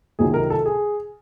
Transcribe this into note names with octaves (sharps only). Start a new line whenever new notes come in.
C#2 C3 D#3 F#3 G#4
A#4
A4
G#4